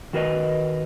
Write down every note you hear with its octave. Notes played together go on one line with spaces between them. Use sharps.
D#3 F#4 A#4 B4 D#5